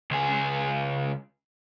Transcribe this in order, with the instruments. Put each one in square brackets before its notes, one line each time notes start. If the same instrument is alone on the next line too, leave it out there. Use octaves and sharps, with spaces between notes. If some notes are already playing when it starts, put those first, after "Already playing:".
[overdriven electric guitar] C#2 G#4